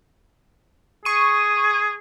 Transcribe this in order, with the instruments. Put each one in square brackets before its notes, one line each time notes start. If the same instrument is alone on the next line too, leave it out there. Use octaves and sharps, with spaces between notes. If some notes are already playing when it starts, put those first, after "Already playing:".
[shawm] G#4 [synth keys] C#6 D#7